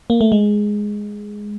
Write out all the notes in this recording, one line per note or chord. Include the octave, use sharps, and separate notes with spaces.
A#3
A3
G#3